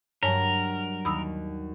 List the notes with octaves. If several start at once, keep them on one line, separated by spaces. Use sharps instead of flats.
G2 F#3 A#4 C#5 G#5 A5
D#2 B5 D#6 E6